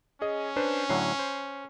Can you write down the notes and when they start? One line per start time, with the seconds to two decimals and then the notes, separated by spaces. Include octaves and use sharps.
0.22 C#4 G#4 D#5
0.56 D4 B4 C5
0.90 A2 D3 F#3 C7
1.19 C5